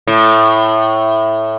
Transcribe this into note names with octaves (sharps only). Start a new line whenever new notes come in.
A2